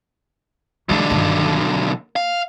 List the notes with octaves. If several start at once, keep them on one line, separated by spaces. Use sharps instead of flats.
B1 D3 E3 G#3
G1 D#3
A#3
F5